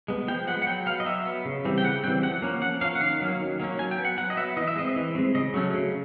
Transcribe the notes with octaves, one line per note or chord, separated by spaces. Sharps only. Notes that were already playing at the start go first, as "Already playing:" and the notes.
G#3 B3
F3 G5
G#3 B3 F#5
F#5
F#3 G5
B3 F5
D#5
F#3 E5
B3
C#3
E3 G3 C4
G5
C#3 F#5
E3 G3 C4 G5
F3 F#5
A#3 C#4
F3 F#5
A#3 C#4 F5
F#5
D#3 F5
F#3 A#3 C#4
D#3
F#3 A#3 C#4
F#3 G#5
G5
B3
F#5
F#3 F#5
D#5
B3 E5
E3 D#5
E5
G#3 C4 D#5
E3
G#3 C4
C#3 D#5
F#3 A3 C#4
C#3